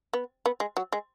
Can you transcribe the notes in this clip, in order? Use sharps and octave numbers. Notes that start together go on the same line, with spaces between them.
B3
B3
G#3
F#3
G#3